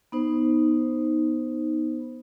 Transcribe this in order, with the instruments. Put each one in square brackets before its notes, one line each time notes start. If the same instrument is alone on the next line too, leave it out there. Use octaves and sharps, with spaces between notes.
[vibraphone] B3 D#4 C5